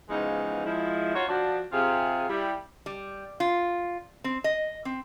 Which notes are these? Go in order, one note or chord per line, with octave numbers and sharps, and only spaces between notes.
C#3 E3 F3 G#3 B3 D#4
F3 G#3 E4
D#4 F4 F#4 C#5
F3 D4 F#4
C3 F4 G#4
G3 E4
G3
F4
C4
D#5
C4